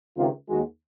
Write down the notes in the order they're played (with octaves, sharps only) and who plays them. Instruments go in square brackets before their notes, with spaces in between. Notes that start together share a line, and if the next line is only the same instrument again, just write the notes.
[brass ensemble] C#2 C3 D#3 F4
D#2 D#3 G#3 F#4